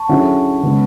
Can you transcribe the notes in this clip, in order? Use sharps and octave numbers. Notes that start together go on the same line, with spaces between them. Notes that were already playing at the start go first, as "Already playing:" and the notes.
Already playing: A5 C#6
D3 F#3 C#4 E4 G#4 F#5
C#3 G#3 B3